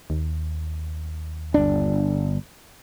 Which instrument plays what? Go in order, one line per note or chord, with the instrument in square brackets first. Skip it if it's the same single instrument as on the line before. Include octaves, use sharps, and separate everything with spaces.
[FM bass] D#2
[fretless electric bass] G1 D4